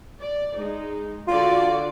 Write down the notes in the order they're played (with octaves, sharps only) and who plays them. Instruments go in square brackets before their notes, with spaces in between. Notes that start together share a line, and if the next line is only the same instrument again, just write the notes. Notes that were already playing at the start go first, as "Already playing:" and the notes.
[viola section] D5
G#3 D#4
[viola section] D3 F#4 D5 [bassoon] F4